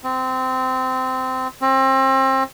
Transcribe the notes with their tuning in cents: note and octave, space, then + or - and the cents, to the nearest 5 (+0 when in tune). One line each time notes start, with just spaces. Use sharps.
C4 -20
C4 +30